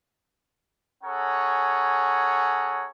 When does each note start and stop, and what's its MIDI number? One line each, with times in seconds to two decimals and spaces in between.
1.03 2.87 61
1.03 2.87 68
1.03 2.87 69
1.03 2.87 73
1.03 2.87 78
1.03 2.87 82